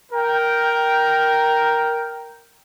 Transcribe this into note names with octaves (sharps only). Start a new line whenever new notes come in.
A#4 G5